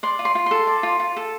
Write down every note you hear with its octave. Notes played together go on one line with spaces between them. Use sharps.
D5 C6
F4
C6
F4
A4 C6
D5
F4
F4
A4